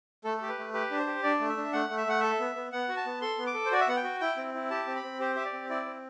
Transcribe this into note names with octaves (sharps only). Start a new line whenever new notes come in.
A3 A4
G4 A4
B4
A3
G4 B4
D4
C5
G4
D4 D5
A3
E5
D4
A3 F#5
A3
E5
A3 F#5
A4 E5
B3
B3
B3 F#5
F#4
A5
B3
A4 C6
B3
D6
A4
C5
F#4 D5
E5
B3 F#5
G5
F#4
E4 G5
C4
E4
G4 A5
C4
B5
C4
G4 C5
G4 E5
D5
C4
E4 D5
C4